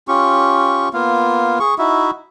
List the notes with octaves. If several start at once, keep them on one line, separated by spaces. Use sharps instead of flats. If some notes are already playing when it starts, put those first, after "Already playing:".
C#4 F4 G4 C#6
A#3 B3 F4 F5
G#4 C#6
D#4 E4 F#4 E5